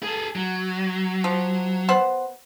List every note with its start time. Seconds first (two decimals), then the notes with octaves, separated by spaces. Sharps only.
0.03 G#4 A4
0.36 F#3
1.24 F3
1.89 B3 C5 F#5